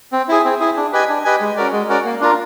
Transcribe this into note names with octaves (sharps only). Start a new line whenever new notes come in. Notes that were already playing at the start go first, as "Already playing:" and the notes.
C4
E4 G#4
C4
E4 G#4
D4
G4 B4 D#5 G#5
D4
G4 B4 D#5 G#5
G#3
C#4 F#4 A#4 D5
G#3
C#4 F#4 A#4 D5
A#3
D4 F4 A#4